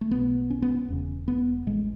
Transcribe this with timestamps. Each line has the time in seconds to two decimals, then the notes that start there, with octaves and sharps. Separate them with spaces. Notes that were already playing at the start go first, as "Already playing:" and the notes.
0.01 A3
0.10 B1 B2 B3
0.50 C#4
0.62 B3
0.75 C#4
0.88 E1 E2 C#3
1.28 B3
1.67 A1 A2 G#3